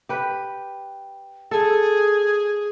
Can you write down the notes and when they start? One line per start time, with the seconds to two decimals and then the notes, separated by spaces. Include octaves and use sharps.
0.09 G4 B4
1.51 G#4 A4